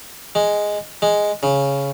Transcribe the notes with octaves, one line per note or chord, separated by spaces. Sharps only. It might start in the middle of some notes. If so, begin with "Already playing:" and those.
G#3
G#3
C#3